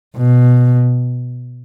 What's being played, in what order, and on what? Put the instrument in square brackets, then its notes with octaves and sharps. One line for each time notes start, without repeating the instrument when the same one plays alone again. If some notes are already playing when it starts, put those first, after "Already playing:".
[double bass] B2